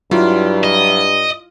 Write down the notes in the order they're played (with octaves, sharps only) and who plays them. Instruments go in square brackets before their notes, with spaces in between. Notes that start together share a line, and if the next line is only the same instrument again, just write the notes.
[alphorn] G2 [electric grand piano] F#3 E4 [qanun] F4
[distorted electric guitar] D#5